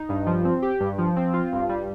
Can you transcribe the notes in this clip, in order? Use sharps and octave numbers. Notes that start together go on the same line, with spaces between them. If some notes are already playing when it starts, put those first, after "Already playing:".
Already playing: D#4
G2
F3
C4
G4
G2
F3
C4
F4
G2
G3